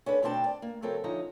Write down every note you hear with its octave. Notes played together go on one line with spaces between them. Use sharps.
C#4 D4 A4 B4
D2 B2 C4 D4 G5 A5
D5
A#3
C#3 F#3 C4 A4 A#4
D3 F3 C#4 D#4 E5 A#5